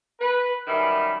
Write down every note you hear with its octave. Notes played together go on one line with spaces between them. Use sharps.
B4
F#2 D#3 G3 E5 B5